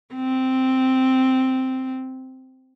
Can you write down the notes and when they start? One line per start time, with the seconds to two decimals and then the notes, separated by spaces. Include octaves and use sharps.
0.15 C4